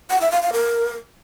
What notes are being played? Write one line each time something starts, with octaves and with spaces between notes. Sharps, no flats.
F#5
E5
F5
F5
A#4